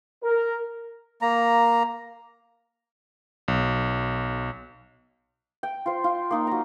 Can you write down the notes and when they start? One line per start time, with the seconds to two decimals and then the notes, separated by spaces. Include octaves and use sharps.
0.23 A#4
1.22 A#3 A#5
3.48 B1
5.63 G5
5.86 F4 C5
6.04 F4
6.31 A#3 D#4 F4
6.47 F#3 A#5